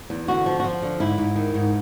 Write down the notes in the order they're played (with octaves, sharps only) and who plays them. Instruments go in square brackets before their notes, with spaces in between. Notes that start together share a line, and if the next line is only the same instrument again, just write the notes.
[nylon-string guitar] E2
D3 F#4
F3
F#4
F3 F4
D3
G#2 E4
G#2
D#3
G#2